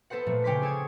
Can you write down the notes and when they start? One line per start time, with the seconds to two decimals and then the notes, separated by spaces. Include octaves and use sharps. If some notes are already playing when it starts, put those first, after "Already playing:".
0.10 B3 A4 B4 C5 F#5
0.27 A#2 F3 A3
0.44 C#3 C#4 G5 C6 D6 B6
0.62 G#4 A4 C#5 G#6